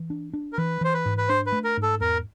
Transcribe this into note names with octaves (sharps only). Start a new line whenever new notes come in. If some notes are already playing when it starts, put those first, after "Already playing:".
Already playing: E3
D4
D4
A#4
E3 B4
E3 C5
B4
G#2
B4
D4 C5
B4
A3
A#4
G#2
A4
E2 A#4